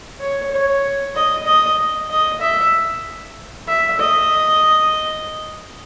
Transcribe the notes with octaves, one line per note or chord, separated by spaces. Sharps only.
C#5
C#5
D#5
D#5
D#5
E5
E5
D#5